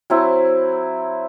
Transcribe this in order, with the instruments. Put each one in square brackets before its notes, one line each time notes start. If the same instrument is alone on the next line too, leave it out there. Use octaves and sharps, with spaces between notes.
[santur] F#3 C4 E4